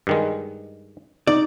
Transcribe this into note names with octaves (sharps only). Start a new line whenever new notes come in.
G2 D#3 G#3
D#4 D5